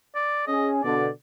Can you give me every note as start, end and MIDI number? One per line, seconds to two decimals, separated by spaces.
0.15 0.43 74
0.47 0.83 61
0.47 0.83 68
0.47 0.69 75
0.83 1.08 47
0.83 1.08 50
0.83 1.08 74